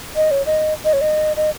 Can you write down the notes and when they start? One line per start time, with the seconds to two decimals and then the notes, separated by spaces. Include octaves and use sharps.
0.16 D#5
0.31 C#5
0.46 D#5
0.85 D#5
0.93 C#5
1.01 D#5
1.37 D#5